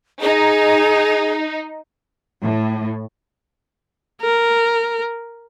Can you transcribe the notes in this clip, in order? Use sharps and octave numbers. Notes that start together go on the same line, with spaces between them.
D#4 G#4
A2
A#4